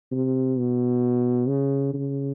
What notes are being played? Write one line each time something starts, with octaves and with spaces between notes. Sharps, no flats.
C3
B2
C#3
C#3